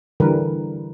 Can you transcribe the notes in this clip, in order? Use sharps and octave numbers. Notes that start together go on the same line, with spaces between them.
D3 E3 G3 A#4 B4